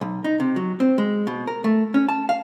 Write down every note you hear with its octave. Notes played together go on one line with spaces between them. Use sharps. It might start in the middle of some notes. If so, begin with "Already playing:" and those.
B1
D#4
C3
F#3
C4
G#3
B2
A#4
A3
C#4
A5
F5